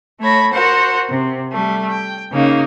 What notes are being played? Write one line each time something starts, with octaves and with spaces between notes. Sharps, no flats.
A3 C#5 B5 A#6
F#4 A#4 C5 F#5
C3
G3 A3
G5
C#3 A#3 D#4